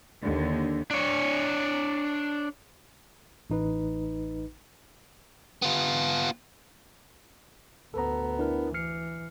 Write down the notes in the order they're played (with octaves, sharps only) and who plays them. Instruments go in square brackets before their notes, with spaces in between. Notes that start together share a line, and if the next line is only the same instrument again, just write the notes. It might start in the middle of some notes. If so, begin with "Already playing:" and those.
[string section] D#2 D3
[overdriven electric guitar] D4 C#5
[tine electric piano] A1 D#4 B4
[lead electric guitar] B3 F4
[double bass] D2 B3 [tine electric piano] A4 A#5
[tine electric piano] D4 E4 A#4
[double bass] E3 [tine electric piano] F6 C7 C#7